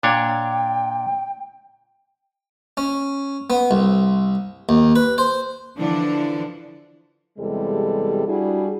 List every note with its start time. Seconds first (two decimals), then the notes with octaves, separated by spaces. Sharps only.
0.03 A#2 D4 C#5 G5
2.77 C#4
3.50 B3
3.71 C2
4.69 D#2
4.96 B4
5.18 C5
5.77 D3 E3 F3 D4
7.38 E2 C3 G3 G#3 A4
8.27 G3 D4 E4 F#4 G#4